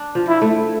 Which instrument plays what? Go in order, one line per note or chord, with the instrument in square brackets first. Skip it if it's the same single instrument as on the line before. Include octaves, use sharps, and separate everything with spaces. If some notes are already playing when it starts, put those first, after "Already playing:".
Already playing: [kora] D4
F3
[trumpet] E4
[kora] A3